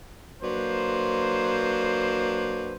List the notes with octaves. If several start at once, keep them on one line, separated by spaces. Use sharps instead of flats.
F#3 A#3 D4 B4 C5